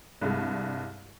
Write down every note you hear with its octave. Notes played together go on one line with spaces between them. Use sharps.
C2 G2 G#3